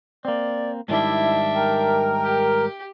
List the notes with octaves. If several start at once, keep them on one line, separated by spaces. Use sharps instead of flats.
A#3 C4 D5
G#2 D#3 G3 D4 E4 E5
A#4 G5
G4